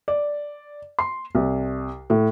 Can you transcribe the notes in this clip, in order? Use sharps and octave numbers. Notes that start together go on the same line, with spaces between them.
D5
C6
C2
A2